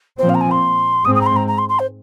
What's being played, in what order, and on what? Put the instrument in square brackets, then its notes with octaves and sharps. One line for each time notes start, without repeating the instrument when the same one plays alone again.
[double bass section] A#2 F3 C4 [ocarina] C5
[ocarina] F5
A#5
G#5
C6
[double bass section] G#2 G#3 C4 [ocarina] D#6
[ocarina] D#6
A#5
C6
A#5
A#5
C6
C6
C5